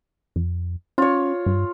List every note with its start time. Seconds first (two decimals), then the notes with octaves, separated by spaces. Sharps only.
0.36 F2
0.98 C#4 F4 C#5
1.46 G2